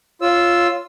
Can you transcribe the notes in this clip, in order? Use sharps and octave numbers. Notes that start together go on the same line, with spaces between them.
F4 C#5 E6